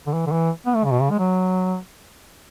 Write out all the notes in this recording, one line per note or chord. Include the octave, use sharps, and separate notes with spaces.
D3
E3
D3
E3
B3
A3
C#3
B2
C#3
G#3
F#3